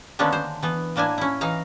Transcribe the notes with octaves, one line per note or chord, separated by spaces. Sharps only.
D3 D#3 A#3 B3 C#4 D4
C5
E3 B3
A2 A#3 D4 E4 G#5
C#4 E4
E3 D#4 F5 A#5